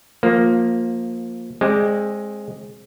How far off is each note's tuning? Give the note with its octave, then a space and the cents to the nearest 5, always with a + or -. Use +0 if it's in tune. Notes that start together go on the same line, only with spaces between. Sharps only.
F3 +15 A#3 +0
G#3 +0 C4 +25 D5 +0